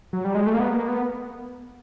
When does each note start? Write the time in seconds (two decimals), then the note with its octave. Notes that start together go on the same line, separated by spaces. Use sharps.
0.13 F#3
0.25 G3
0.35 G#3
0.47 A3
0.54 A#3
0.60 B3
0.75 A#3
0.88 B3